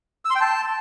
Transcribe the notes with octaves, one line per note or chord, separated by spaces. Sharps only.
E6
C6
G5
A5